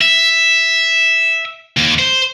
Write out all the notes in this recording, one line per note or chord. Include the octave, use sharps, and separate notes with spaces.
E5
D#2
C5